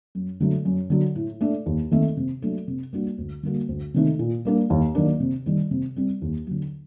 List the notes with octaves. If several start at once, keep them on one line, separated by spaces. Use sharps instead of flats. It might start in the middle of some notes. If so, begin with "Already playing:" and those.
F#2
D3 F#3 A3
F#2
D3 F#3
A2
A3 D4
D#2
D#3 A3 C4
C3
F#3 A3 D4 A4
C3
G3 A#3 D4 F#4
D2
D3 G3 A#3 F#4
D2
C3 D#3 A3 D#4
A#2
G3 A#3 D4
D#2
D#3 F#3 A#3 D4
C3
D#3 G3
C3
G3 C4
D#2
D3 F#3